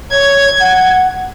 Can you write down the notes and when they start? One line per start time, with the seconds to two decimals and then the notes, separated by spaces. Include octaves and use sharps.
0.11 C#5 G#6
0.59 F#5